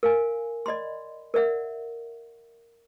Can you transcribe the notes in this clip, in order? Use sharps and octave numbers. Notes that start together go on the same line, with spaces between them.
A#4 F5 G#5
D5 D#5 B5 C6
A#4 D5 E5 F#5